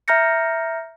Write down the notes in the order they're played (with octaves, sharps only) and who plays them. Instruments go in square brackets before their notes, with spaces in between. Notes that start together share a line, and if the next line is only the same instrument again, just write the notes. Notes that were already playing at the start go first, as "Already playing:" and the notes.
[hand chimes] E5 A#5 F6 G6 A#6 C#7